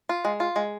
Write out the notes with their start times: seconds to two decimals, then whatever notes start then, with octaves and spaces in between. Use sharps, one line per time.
0.09 F4
0.25 G#3
0.40 F4
0.56 G#3